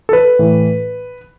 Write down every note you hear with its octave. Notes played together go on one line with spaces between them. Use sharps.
A4
B4
A2 E3